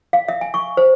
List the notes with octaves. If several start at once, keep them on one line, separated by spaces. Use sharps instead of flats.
F5
E5
G#5
C#6
C5